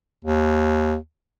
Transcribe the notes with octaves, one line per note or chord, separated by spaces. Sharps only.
D#2